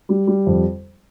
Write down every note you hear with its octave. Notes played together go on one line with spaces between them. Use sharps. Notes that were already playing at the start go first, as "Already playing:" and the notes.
G3
G3
F2